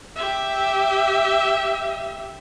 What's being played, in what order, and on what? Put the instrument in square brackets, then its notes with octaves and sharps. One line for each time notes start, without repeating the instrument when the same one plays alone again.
[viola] G4 E5